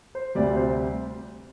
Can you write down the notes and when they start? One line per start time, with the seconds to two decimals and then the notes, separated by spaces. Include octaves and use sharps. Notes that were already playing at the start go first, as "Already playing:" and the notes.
0.15 C5
0.35 D2 C3 G3 D5
0.56 C5